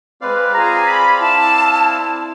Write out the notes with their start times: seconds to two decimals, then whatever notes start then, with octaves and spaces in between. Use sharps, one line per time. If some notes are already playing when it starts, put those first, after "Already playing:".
0.21 G#3 C4 B4 D5 F5
0.53 F4 G#4 A#5
0.86 B5
1.20 E4 A5